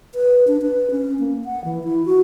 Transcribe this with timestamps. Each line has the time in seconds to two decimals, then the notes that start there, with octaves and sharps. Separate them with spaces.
0.15 B4
0.47 D4
0.62 B4
0.91 C#4
1.19 A#3
1.45 F#5
1.65 E3
1.84 E4
2.05 F#4